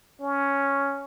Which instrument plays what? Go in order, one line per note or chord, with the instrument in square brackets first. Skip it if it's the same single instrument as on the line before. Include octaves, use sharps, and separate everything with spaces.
[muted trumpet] C#4